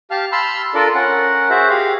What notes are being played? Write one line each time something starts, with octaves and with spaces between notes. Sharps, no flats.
G4 F5 A5 F6
A5 B5 C6 E6 F6
D4 F4 A4 A#4 D5
C#4 A#4 F#5
F#4 G#4 C5 E5
G4 G#4 F5